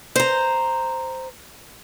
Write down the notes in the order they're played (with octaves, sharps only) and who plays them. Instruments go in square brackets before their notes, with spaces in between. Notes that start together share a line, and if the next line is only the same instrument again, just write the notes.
[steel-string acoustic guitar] C5 A#5